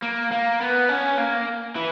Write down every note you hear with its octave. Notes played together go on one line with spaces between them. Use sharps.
A#3
A#3
B3
C#4
A#3
E3